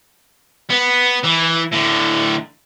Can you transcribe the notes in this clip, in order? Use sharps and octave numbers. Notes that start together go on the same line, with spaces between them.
B3
E3
A2 D3